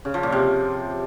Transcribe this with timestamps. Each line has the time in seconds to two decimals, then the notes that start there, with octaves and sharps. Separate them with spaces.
0.05 C#3
0.14 F3
0.23 A#2
0.32 C3